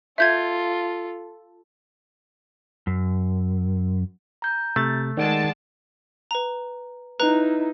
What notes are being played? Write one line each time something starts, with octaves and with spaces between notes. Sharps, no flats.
F4 A4 E5 G6 G#6
F#2
A#5 G6
C3 A3 A6
D#3 G#3 D5 F#5 A5 D7
B4 A#5
D#4 E4 B4 A#5 F#6